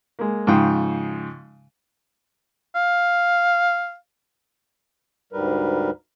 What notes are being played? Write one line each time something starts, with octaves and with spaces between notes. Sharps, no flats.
G#3 A#3
G#2 C#3 F3 G5 D#6
F5
D2 G#2 G3 A#4 B4